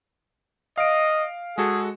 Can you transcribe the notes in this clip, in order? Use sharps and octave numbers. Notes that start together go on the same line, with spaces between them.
D#5 F5 D7
G#3 F#4 G#4 A4